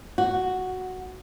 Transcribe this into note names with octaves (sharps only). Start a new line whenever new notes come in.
F#4